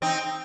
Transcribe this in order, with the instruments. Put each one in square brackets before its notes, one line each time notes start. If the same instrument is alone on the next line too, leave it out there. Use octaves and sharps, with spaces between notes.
[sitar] C4 D#4